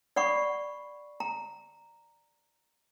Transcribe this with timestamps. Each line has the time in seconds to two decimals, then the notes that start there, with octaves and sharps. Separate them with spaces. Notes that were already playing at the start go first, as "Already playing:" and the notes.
0.16 D5 F#5 B5 C#6 D6
1.20 A#5